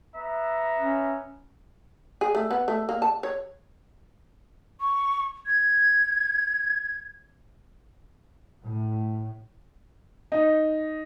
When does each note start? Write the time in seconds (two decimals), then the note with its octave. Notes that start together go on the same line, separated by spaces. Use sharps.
0.15 B3 E5 A#5
0.78 C#4
2.21 G#4
2.35 A3
2.51 B3
2.68 A3
2.89 A#3
3.02 A5
3.23 C#5
4.80 C#6
5.46 G#6
8.63 A2
10.32 D#4